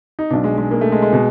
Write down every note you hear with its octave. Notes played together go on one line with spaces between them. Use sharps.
D#4
B1 B2 D4
G#3
G#3
A#3
A3
G#3
G#3
B2